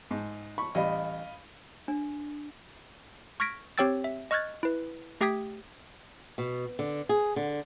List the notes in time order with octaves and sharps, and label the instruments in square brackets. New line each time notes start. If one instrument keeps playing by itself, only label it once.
[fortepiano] G#2
B5 C#6
[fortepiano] A1 G3 D5 [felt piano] D#5 F5 B5
[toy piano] D4
[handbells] C#6 F6 G#6 A#6 B6 D7
C4 G4 C#5 G5 E6 A6
E5
D#5 C#6 F6 F#6 G#6 A6
E4 B4
A3 G4 G5 D#6 G#6 B6
[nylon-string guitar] B2
D3
G#4
D3